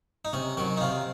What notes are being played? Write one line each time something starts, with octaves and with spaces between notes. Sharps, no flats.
D#4
C3 C#4
D#3 F#3 C#4
D#4
C3 F4